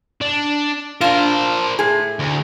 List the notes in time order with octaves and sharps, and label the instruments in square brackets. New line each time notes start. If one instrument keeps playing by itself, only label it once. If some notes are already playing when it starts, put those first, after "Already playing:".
[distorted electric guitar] D4
[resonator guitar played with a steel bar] D4 F4 [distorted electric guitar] A#4 C5
[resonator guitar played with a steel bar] A2 G#4
[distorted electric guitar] D2